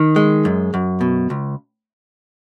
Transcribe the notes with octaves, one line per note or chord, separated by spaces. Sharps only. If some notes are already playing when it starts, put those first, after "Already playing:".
Already playing: D#3
G#3
F#2
F#2
B2
C#2